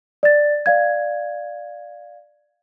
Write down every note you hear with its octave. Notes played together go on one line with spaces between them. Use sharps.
D5 A6
D5 F5 G#6